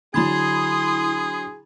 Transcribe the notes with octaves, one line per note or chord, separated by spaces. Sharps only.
D3 F#3 E4 G#4 B5 C6 D#6 G#6